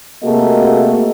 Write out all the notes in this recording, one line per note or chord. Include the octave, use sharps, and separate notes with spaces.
C3 A3 A#3 F#4 G#4 D#5